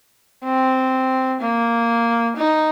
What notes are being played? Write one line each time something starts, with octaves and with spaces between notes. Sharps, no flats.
C4
A#3
D#4